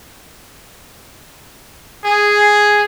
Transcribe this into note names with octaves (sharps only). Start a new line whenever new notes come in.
G#4